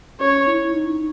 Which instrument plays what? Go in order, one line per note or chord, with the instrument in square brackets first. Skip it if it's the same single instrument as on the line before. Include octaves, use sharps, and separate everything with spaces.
[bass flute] C#4 [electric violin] C#5
[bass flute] E4
D#4